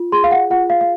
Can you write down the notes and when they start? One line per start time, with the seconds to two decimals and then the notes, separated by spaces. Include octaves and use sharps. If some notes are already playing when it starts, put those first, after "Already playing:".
Already playing: F4
0.12 G#4 C6
0.24 F5
0.31 F#5
0.50 F4 F#5
0.70 F5
0.81 F5